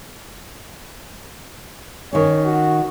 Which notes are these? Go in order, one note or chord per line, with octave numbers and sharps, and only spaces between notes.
D#3 C#4 C#5
F#4